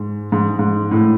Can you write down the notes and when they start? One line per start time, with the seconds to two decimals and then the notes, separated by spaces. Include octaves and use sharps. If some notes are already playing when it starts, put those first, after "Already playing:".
Already playing: G#2
0.32 G#2
0.59 G#2
0.91 A2